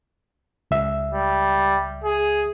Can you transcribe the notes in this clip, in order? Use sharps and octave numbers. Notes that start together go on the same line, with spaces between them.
C#2 E5
G3
G#4